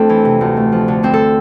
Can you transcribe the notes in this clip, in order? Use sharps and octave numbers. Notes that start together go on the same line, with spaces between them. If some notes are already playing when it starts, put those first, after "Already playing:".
Already playing: F2 A3 C4 D4 A4
E3
C3
D2
A3
F3
D3
G2 C4
A4